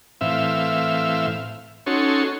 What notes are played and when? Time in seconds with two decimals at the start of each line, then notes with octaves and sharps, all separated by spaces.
0.21 A2 E3 C4 E5 F5
1.86 C#4 D#4 F#4 A4 C#5 C6